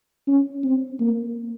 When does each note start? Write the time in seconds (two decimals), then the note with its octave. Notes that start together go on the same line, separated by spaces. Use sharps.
0.28 C#4
0.63 C4
1.00 A#3